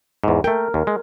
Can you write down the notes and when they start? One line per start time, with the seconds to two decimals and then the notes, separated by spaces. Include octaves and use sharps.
0.24 E2 G#2
0.44 A3 A#4 G5
0.74 D#2
0.87 G#3